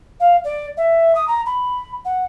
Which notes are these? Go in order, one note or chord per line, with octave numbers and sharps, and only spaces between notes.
F5
D5
E5
D#6
A#5
B5
F#5